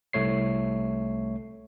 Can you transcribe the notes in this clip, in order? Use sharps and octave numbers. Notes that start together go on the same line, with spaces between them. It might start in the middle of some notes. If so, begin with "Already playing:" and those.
C2 A3 C#5 C7